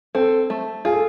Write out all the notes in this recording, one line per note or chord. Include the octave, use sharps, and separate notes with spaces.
C4 A4
A3
F4 G#4
A4